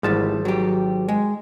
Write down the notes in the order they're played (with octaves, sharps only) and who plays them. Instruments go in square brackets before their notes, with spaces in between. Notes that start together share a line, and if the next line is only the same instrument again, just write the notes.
[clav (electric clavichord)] G#1 F3 A5 [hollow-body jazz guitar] G#2 E3 G3
[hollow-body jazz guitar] F#3 G4
G#3